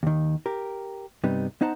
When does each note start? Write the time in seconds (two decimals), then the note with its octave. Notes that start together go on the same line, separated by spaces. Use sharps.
0.03 D#2 D#3
0.46 G4 A#4
1.24 G2 C3 G3 B3 D#4
1.61 B3 D#4 C5 F#5 A5 A#5